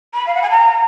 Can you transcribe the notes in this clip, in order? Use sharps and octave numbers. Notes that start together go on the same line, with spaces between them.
B5
F5
F#5
G#5
A#5